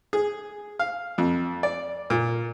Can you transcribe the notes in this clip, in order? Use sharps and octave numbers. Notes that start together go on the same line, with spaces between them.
G#4
F5
F2
D5
A#2